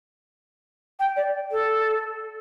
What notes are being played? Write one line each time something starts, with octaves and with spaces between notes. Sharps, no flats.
G5
D5
A4